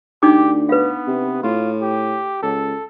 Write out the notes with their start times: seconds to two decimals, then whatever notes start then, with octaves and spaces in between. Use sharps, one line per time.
0.23 D2 D4 D#4 G4 D6
0.69 B3 B4 F5
1.07 C3
1.44 A2 F4
1.82 G4
2.43 C#2 A4